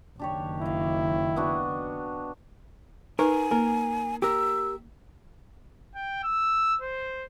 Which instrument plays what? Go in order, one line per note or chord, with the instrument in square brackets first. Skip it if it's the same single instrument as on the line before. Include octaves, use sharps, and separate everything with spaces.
[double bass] F#1 D#3 [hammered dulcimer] D4 G4 C#5
[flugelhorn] E4 [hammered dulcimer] D#5 F5
[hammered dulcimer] B3 D4 F#4
[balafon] D#4 B4 [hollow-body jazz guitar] A#4 [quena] G#5
[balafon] A#3 [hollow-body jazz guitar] A#4
[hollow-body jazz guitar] G4 A#4 [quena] E6
[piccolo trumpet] G5
E6
C5